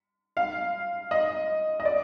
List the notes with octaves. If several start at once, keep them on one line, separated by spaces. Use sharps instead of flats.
F5
D#5
D#5
D5